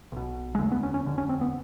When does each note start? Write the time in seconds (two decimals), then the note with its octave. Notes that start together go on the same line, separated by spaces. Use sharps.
0.12 B1 B2
0.55 G#3
0.59 F1 D#2 D3 A3
0.72 B3
0.83 C#4
0.94 C#4
1.06 F1 D#2 D3
1.18 C#4
1.29 C4
1.41 B3